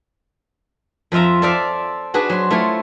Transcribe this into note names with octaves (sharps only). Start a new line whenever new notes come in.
F2 F3 F4 E5 A#5
A4 C5 D5 E5 F5 A5
D4 F#4 G#4 B4
F#3 C5
A3 E4 F4 C5 C#5